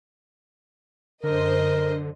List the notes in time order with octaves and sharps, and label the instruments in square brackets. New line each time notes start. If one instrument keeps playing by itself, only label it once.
[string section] F#2 C5 D#5 [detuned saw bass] D3 [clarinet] A#4